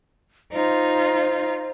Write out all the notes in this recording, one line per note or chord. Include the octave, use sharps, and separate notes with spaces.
D#4 F4 C5